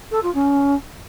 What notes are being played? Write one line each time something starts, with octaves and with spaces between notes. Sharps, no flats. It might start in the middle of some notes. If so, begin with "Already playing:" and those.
A4
F4
C#4